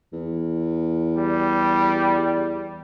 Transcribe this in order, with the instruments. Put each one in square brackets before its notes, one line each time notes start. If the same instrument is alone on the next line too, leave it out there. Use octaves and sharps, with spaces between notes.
[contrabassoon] E2
[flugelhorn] G3